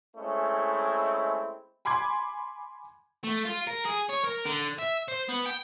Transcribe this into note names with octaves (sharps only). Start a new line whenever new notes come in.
G#3 A3 C4 C#4 E4
G#5 B5 C6 D6 G#6
A3
F4
A#4
G#4
C#5
A#4
D3
E5
C5
B3
G5